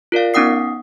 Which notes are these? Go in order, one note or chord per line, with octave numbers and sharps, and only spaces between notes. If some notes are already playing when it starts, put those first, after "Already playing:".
F4 A#4 D5 F5
B3 C#4 D#4 F#5 D#6 C7